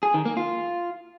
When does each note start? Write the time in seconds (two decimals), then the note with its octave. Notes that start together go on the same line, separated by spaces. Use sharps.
0.03 G#4
0.14 D#3
0.25 A#3
0.37 F4